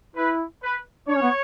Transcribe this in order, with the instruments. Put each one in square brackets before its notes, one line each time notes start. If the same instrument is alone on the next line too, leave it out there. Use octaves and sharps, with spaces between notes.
[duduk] E4 [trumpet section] B4
[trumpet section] B4
[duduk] D4 [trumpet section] C#5
[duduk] C#4
B3